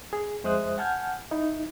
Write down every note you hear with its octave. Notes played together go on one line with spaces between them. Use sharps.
G#4
F2 G#3 C5 E5 D#6 F#6
F#5 G#5 A5 F6 G6 G#6
D#4 E4